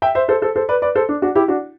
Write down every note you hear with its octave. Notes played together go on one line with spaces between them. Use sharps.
E5 G5
C5 E5
A4 C5
A4 C5
A4 C5
B4 D5
B4 D5
A4 C5
D4
D4 F#4
E4 G4
D4 F#4